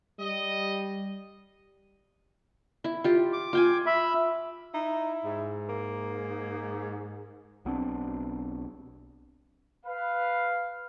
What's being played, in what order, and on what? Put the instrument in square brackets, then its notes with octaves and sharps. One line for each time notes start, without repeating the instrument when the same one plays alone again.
[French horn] G3 [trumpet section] D#5
[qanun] E4
F4 G4
[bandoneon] D6
[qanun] F4 G5 G#5
[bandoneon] E5 B5
[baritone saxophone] D#4 [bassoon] E4
[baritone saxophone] G#2
[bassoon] A#3
[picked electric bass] B1 B3 C4 D4
[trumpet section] B4 F5